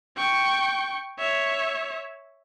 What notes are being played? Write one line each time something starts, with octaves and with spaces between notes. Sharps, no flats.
G5 C#6
C#5 E5